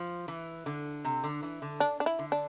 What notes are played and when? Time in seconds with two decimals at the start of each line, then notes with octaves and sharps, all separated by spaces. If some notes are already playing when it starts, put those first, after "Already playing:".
Already playing: F3
0.28 E3
0.66 D3
1.05 C3
1.24 D3
1.43 E3
1.62 D3
1.80 D4
2.00 D4
2.06 E4
2.19 D3
2.32 D4